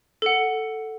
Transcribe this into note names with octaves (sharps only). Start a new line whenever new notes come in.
A4 F#5